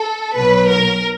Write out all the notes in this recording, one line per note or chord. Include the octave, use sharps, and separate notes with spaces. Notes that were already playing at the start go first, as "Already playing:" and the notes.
Already playing: A4
B1 B2 F#3 B4
A#4